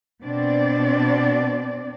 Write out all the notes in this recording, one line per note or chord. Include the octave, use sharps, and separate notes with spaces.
B2 C4 D4 D5